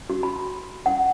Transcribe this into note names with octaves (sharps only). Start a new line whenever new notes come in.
F#4
B5
F#5